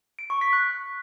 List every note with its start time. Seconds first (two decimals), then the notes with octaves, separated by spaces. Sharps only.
0.19 D7
0.30 C#6
0.41 B6
0.53 F#6